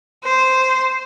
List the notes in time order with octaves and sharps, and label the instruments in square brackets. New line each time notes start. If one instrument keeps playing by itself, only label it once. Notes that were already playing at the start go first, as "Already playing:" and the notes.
[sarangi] C5